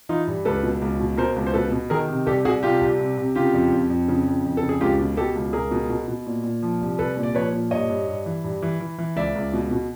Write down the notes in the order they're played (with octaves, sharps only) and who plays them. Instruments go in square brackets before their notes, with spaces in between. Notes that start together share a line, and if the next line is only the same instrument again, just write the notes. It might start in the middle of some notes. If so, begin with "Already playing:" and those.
[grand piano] E3 D#4 F4
G2
C#2 A4 B4
B2
C#2
B2
B2 A#4 C5
C#2
C5
B2 A4 B4
B2
D#3 G#4 A#4
C3
C2 G4 A4
C2 F#4 G#4
C3 F4 G4
C2
C3
C3
C#3 F4 G4
F2
F2
F2
C#3
F2
F2
A4
C#3
G#4
C#2 F4 G4
B2
B2 G4 A4
C#2
C#2 G#4 A#4
B2
B2
B2
A#2
A#2
F3
C2
C2 A4 B4
A#2
D5
F3 B4 C#5
A#2
G2 C#5 D#5
G2
G2
E3
G2
E3
E3
E3
C#2 D5 E5
C#2
B2
B2